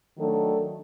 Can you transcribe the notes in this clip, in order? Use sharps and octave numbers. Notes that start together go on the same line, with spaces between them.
D#3 F#3 A3 D4 F#4 A4